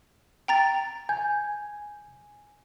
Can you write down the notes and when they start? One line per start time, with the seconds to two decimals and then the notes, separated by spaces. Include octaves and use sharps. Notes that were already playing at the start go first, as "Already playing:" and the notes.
0.48 G5 A#5 A6
1.09 G#5 G6